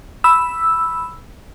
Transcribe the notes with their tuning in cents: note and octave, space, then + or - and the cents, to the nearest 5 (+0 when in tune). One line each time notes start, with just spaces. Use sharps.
B5 +0 E6 +0